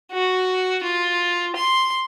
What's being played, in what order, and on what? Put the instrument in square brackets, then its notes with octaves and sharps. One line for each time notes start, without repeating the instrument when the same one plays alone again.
[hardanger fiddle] F#4
F4
C6